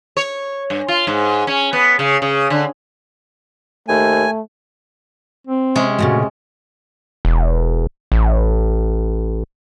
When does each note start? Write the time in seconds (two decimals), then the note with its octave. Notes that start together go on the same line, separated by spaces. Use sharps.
0.17 C#5
0.70 G2
0.88 F4
1.07 G#2
1.47 C#4
1.73 B3
1.99 C#3
2.22 C#3
2.50 D3
3.88 D#2 A3 G#5
5.47 C4
5.75 C3 G#3 C#4
5.98 A#2 C#3 A3 F#4
7.25 E1
8.12 A1